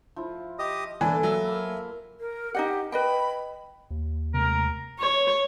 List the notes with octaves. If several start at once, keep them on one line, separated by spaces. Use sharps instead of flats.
F3 E4
G4 D#5 D#6
E3 A#3 D4 A4 B4 G#5
F#3 E5 E6
A#3
A#4
D#4 G4 D#5 F#5
B4 D#5 G5 B5
D#2
C3 G#3 A3 A#4
C#5